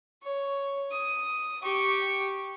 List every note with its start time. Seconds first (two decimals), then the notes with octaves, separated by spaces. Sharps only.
0.23 C#5
0.92 D#6
1.62 G4 C#6